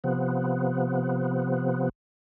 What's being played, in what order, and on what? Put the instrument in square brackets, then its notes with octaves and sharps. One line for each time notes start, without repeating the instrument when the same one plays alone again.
[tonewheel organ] C3 F3 B3